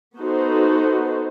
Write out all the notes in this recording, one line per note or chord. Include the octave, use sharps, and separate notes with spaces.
B3 D#4 F#4 A4 C5